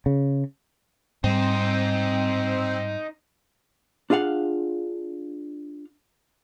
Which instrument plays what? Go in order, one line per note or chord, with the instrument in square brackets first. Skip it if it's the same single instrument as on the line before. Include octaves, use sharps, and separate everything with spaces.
[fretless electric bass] C#3
[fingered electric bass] G#2 G3 [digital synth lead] C4 [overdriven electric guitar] D#4 C5
[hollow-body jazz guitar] D4 F4 G#4 F5 F#5